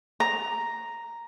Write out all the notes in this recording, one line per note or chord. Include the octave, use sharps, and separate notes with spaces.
A#5